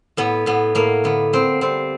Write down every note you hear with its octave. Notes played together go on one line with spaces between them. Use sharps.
A2 B3
A2 B3
A2 A#3
D3 B3
A#3 C4
G3 C4